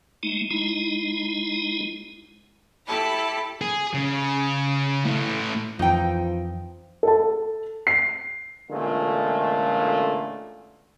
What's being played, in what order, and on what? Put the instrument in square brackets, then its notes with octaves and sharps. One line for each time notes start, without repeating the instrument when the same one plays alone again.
[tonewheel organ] G#3 A3 D#4
G#3 D#4 E4
[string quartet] E4 G4 A4 A5 B5
[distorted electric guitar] G#4
C#3
A2 E3
[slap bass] F2 E3 [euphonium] F3 [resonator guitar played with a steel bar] D#4 G5
[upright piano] A4 A5
C7
[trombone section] A1 A#2 D3 G#3 A3 F4